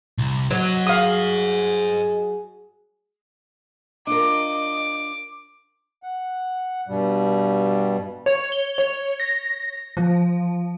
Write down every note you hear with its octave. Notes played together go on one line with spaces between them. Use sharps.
C2
F#3 C5 D#5
G#4 F5 D#6
D4 F4 A#4 D#5 D6
F#5
G2 B2 G3
C#5
G7
C#5
A#6
F3